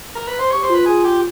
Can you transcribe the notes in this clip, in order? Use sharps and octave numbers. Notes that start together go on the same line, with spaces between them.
A#4
B4
C5
G4 C#5
C5
F4 B4
G#4
G4